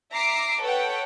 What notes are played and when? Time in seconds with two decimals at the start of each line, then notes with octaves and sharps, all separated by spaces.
0.12 E5 A#5 D6 C7 D7
0.61 A4 B4 C#5 F#5 G5